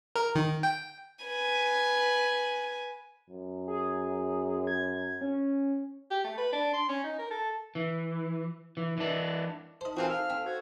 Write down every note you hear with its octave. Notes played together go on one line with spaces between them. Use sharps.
A#4
D#3
G5
B4 G#5
F#2
G#4
G#6
C#4
G4
A3
B4
D4
C6
C#4
D#4
A#4
A4
E3
E3
E3 D4
D#4 C5 D#5 A5
E3 C4 F4 F#4 G#4 A#4 C5
A4 F5 F6
C4 A4
F#4 A4 C5 G#6